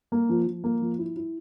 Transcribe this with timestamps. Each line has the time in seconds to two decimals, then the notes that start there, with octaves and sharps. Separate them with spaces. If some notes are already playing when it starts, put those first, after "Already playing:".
0.12 A#3
0.29 F3
0.47 F3
0.64 A#3
0.82 F3
0.99 E4
1.16 E4